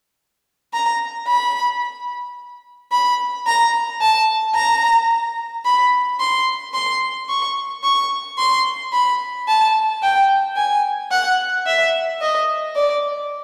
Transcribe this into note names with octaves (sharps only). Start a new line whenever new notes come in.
A#5
B5
B5
A#5
A5
A#5
B5
C6
C6
C#6
C#6
C6
B5
A5
G5
G#5
F#5
E5
D#5
D5